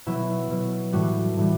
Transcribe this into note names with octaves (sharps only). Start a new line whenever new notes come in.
B2 F#3 E4
B2 F#3
A2 E3 G3 F#4
A2 E3 G3